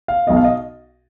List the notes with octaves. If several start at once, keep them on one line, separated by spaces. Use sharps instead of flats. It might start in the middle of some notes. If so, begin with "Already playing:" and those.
F5
B1 B2 D#5
F5
D#5